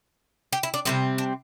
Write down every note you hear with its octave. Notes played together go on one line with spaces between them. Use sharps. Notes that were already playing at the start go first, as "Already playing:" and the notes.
G4
E4
D4
C3 G3 C4 E4
D4